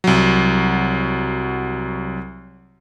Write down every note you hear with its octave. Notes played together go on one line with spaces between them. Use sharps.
C2 F#3